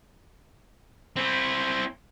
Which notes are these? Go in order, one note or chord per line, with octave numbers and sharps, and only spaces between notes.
C4 E4